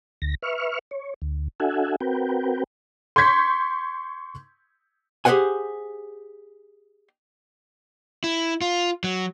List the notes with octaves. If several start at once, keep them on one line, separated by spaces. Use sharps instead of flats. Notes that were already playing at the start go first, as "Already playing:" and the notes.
D2 A#6
B4 E5 C#6 F6
C#5
D2
D4 F#4 A4 E5 F#5 G#5
C4 F#4 A#4 B4 G5
C6 C#6 G6 G#6 B6
G4 G#4 A#4 C5 F#5 G#5
E4
F4
F#3